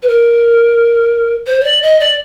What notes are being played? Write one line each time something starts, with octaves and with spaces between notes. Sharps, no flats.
B4
A#4
C5
C#5
D5
D#5
D5